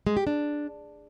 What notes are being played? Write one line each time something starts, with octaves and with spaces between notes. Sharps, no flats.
G#3
G4
D4